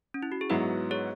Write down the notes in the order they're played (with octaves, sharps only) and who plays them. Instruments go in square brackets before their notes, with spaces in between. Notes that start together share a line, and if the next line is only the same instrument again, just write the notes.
[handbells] C#4
E4
F#4
G#4
[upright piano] G#2 F#3 B3 E4 [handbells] F#4 B4
[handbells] G#4 C#5